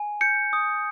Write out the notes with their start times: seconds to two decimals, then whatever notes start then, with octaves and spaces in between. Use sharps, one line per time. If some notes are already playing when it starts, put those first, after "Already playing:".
Already playing: G#5
0.21 G6 C#7
0.53 D#6